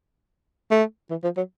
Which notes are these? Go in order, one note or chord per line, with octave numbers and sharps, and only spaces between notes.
A3
E3
F3
F#3